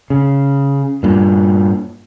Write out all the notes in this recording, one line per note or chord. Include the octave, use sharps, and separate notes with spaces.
C#3
G2 A#2